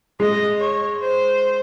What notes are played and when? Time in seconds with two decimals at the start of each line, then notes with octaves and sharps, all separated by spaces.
0.20 G#3 D#5
0.60 C#5
1.01 C5